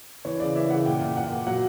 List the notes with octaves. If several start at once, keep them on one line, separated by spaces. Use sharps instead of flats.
E3 C#5
C#3 D5
E3 E5
C#3 F#5
A#2 G5
A#2
A#2 F#5
A#2
F#3 F#5